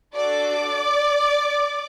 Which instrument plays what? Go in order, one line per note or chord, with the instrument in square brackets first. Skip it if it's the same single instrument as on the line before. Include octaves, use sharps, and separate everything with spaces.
[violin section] D4 F#4 A4 D5 D6